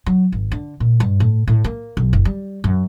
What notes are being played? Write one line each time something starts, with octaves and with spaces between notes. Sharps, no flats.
F#3
G#1
D3
A#2
G2
A2
A2
A#3
B1
F#1
G3
F#2